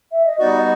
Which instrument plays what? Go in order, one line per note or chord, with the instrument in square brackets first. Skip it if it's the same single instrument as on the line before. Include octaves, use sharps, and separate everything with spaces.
[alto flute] E5
D#5
[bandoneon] G3 B3 D#4 F#4 [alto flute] D5
[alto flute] D#5